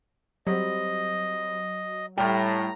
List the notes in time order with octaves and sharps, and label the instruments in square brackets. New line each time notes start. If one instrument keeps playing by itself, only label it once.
[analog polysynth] F#3 [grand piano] G3 C4 [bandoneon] D#5
[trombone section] A2 [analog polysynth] G3 [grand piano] G5 F6 [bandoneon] A#5